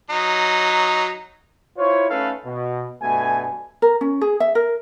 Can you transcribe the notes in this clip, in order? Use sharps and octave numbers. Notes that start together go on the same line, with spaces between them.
F#3 D#4
E4 F4 C5 C#5
A3 C#4 D#4 A4 B4 F5
B2
G2 B2 A3 G#5
A#4
C#4
G#4
E5
A#4